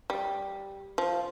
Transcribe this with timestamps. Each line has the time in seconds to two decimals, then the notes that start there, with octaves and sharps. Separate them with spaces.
0.10 G3
0.98 F3